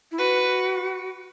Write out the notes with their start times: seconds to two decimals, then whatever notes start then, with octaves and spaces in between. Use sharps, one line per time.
0.12 E4
0.18 F#4 B4